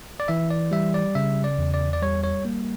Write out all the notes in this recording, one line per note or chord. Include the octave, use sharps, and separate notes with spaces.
D5
E3 E5
D5
G3 E5
D5
C#3 E5
D5
E2
D5
D5
G3 C#5
C#5
A#3